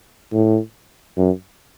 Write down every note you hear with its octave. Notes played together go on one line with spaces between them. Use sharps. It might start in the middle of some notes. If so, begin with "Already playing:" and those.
A2
F#2